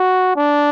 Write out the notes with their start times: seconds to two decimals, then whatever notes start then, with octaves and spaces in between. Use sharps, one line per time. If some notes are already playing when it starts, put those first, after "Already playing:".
Already playing: F#4
0.36 D4